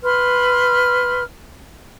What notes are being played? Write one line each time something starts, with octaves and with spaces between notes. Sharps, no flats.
B4 C6 F6